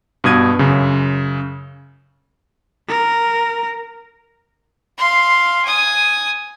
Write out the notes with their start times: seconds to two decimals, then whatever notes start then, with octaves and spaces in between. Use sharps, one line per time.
0.24 G2 B2 D#6 G#6 D#7
0.59 F#2 C#3
2.89 A#4
4.98 F5 C6
5.65 G#5 D#6